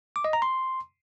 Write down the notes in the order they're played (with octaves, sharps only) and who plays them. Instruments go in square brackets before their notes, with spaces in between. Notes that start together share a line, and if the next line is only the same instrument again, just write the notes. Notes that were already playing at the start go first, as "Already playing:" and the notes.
[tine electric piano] D6
D#5
A#5
C6